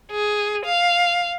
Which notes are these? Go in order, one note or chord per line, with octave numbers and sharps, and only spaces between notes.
G#4
F5